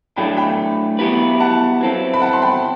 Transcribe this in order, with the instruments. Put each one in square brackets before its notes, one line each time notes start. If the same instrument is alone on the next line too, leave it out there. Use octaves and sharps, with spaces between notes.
[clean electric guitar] A2 F#3 A3 D4 [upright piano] G5 B5
[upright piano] G5 B5
[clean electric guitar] F#3 B3 E4 G4 B4
[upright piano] F#5 A5
[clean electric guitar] F#3 C4 E4 A4
[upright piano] B5
F#5 A5
C6
G5 B5